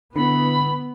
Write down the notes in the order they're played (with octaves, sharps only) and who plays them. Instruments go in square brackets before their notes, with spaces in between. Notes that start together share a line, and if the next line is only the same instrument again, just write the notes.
[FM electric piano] D3 [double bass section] B3 [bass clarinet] E4 [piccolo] B5